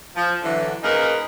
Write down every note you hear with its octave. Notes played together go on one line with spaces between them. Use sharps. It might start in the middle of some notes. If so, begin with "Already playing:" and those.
F3
D3 E3 F#3
A#3 C#4 D#4 G#4 A#4 B4